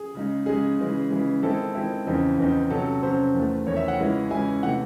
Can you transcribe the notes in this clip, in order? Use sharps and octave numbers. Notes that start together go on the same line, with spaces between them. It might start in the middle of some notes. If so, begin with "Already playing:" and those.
Already playing: G#4
C#3 G#3 D#4
C#3 G#3 D#4 G#4
C#3 E3 G#3
C#3 E3 G#3
D#3 G#3 C4 E4 A4
D#3 G#3 C4 E4
E2 C#3 E3 C4 D#4
E2 C#3 E3 C4 D#4
C3 F#3 C#4 A4
C3 F#3 C#4 C5
E2 D#3 A3
E2 D#3 A3 C#5
E5
F#5
C#3 E3 G#3 C#4 E4
C#3 E3 G#3 C#4 E4 G#5
C3 E3 A3 F#5